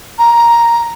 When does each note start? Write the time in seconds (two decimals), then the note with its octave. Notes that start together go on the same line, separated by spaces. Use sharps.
0.18 A#5